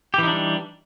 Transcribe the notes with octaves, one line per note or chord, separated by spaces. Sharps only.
E3 G3 D4 D#4 G4